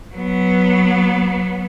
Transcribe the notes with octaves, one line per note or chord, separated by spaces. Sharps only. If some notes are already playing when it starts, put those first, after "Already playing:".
F#3 B3